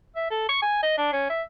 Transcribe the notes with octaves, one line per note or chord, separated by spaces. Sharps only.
E5
A4
C#6
G#5
D#5
D4
C#4
E5